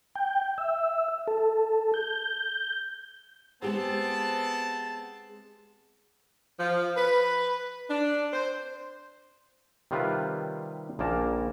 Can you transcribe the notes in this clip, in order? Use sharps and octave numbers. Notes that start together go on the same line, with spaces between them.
G5
E5
A4
G6
G#3 B3 C4 G4 G#4 A5
F3
B4
D4
C5
C3 D#3 G3 F4 G4 B4
A#1 A#2 C#3 A#3 A#4 A5